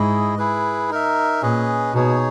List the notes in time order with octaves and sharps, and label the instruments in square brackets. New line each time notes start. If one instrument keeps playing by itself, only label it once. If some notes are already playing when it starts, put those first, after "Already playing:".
Already playing: [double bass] G#2 [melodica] E4 G#4 D#5
[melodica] E4 G#4 B4
D#4 A#4 E5
[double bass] A#2 [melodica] C#4 G#4 B4 D#5
[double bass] B2 [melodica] D#4 G#4 C#5